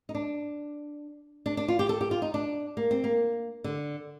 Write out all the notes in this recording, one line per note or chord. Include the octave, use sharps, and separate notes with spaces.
D#4
D4
D4
D4
F4
G4
A4
G4
F4
D#4
D4
A#3
C4
A#3
D3